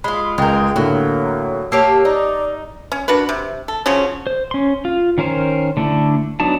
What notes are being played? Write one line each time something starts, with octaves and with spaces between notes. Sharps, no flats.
G#3 F4 B5
C#2 G#3 A#4 G5
A2 D3 F#3 A#3
A#3 G4 C#5 A5 E6 C7
D#4 D5
C#4
D4 F#4 A#4 B4
C3
A4
C#3 F3 F#3 C#4
C5
C#4 C6
F4
D#3 C#4 A#4 C5
D3 A3 D4 E4
F#3 B3 D4 D#4 A5